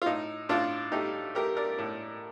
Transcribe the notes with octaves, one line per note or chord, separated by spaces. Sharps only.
F4
A2 D#4
A2 D4 F4
A3 D#4 G4
A3 G4 A#4
A#4 D5
A2